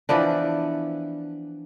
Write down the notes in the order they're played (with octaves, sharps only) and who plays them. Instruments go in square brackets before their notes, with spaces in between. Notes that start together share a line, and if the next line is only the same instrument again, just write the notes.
[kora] E3 F3 B3 D4